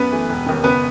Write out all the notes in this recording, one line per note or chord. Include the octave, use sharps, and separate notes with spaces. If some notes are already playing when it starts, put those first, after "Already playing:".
Already playing: F#2 B3 B4
E3 A3
E1
D#2 D#3
F#1 B3 B4